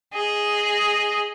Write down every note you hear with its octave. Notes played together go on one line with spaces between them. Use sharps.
G#4 D#5